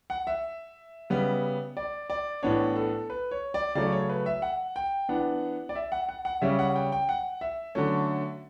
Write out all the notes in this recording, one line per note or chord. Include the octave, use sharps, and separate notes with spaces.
F#5
E5
C#3 G3 B3
D5
D5
A2 E3 B3 D4 C#5
A4
B4
C#5
D5
C#3 F#3 A3 C#4 D5
C#5
B4
E5
F#5
G5
E3 B3 D4 F#5
D5
E5
F#5
F#5
F#5
C#3 G3 C#4 E5
F#5
G5
G5
F#5
E5
D3 F#3 A3 C#4